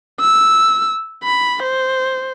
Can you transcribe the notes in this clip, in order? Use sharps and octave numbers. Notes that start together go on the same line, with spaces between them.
E6
B5
C5